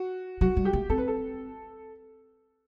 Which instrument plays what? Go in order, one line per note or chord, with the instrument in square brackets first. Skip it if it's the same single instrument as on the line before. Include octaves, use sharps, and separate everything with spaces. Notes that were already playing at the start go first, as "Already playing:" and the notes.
Already playing: [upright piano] F#4
[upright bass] F#3 [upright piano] F#4
[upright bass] G3
[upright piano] G4
[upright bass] A3
[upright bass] C4 [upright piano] A4
[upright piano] B4
A4